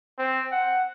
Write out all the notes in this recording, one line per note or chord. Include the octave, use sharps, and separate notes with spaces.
C4
F#5